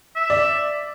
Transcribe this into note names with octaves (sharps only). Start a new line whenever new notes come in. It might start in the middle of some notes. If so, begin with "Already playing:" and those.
E5
D5